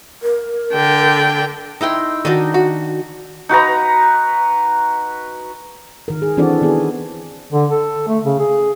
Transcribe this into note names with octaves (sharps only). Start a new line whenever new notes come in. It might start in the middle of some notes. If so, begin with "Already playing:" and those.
A#4
D3 G5
D#4 E4 G5 C6
D#3 D4 D#4 F#4
F#4
D#4 F#4 B4 A#5
D#3 A#4
G#4
E3 C4 D4 F#4 A4 D5
D#3 B3 G#4
D3
A4
A3
C#3
G#4